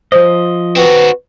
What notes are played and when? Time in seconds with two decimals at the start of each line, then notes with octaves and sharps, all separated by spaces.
0.12 F3 C5 D#5
0.76 C4 F#4 B4